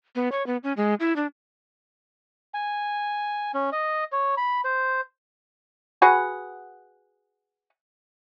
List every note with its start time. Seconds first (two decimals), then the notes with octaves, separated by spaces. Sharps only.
0.15 B3
0.32 C#5
0.47 B3
0.64 C#4
0.77 G#3
1.00 E4
1.16 D4
2.54 G#5
3.54 C#4
3.72 D#5
4.12 C#5
4.37 B5
4.65 C5
6.02 F#4 G#4 B4 F#5